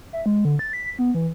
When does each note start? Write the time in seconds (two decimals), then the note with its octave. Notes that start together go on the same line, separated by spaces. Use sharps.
0.13 E5
0.26 G#3
0.45 D3
0.59 A6
0.73 B6
0.99 B3
1.14 E3